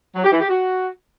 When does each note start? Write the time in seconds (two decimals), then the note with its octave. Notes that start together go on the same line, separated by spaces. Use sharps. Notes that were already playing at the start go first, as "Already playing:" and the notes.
0.15 F#3
0.24 G4
0.32 E3
0.40 G4
0.49 F#4